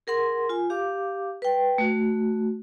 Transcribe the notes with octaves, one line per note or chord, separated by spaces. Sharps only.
G#4 A#4 F#5 C6
F4 G#5
G4 F5 D6
B4 G5
A3 F#4